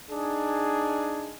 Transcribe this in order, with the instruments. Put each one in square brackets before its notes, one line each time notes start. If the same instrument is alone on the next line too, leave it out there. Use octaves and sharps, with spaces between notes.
[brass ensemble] D4 D#4 G#4